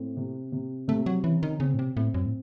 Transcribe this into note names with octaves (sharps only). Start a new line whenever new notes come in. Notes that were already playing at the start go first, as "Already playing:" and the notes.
Already playing: A2 C4
C3
C3
C3 A3
F#3
E3 C#4
D#3
C#3 C4
A2
C3
A2 C4
F#2
A2